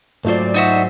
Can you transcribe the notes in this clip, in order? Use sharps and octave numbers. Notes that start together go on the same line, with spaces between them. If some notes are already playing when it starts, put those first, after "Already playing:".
G#2 F#3 A3 F4 C5 D5
D#4 F#4 E5